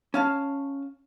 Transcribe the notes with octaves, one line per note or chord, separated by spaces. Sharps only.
C#4 F5 A5